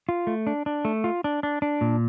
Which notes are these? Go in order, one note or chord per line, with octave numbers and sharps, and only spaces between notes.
F4
A3
D4
D4
A3
F4
D4
D4
D4
A#2